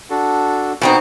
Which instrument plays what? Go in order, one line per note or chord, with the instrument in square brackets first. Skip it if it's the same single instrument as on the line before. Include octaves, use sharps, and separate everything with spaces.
[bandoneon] D4 F#4 A4
[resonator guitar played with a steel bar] B2 C4 D#4